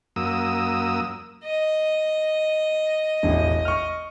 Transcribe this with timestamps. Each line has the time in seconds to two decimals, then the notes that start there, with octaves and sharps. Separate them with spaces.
0.16 F#2 A#3 D#6 E6
1.45 D#5
3.23 E1 A1
3.65 C#6 F6